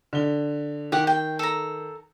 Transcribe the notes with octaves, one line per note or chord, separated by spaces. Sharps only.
D3 G7
D#3 G4 F#5
G5
A4 A#5